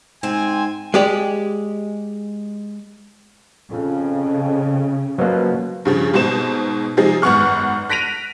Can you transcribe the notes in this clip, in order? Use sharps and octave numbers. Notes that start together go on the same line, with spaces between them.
G#2 C4 G#5
G#3 G4 D5
F2 C#3
B2 F3 F#3 A#3
G2 C#3 F3 G3
G#2 B2 C4 D#4 C5 E7
C3 F3 G#3 C4 D#4
G#1 F#2 B3 F#5 C#6 F6
F#6 A#6 B6 D7 D#7 F7